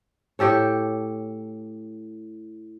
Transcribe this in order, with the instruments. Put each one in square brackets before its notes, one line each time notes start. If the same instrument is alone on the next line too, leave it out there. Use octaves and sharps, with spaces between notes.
[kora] A2 G4 A4 C#5